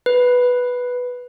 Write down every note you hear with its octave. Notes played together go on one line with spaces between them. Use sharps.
B4